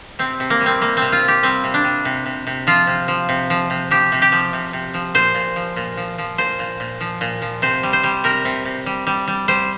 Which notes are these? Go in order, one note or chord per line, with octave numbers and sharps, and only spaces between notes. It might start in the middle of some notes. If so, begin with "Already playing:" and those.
C3 C4
C3
A#3
G3
C4
C3 A#3
C3 C4
F4
C3
G4
G3 C4
C3
D4
G3
C3
C3
C3
F3 F4
C3
F3
C3
F3
C3
F3 G4
C3
G4
F3
C3
C3
F3
A#2 C5
A#2
F3
A#2
F3
F3
A#2 C5
A#2
A#2
F3
A#2
F3
C3 C5
G3
C5
G3
C3 A#4
C3
C3
G3
G3
G3
G3 C5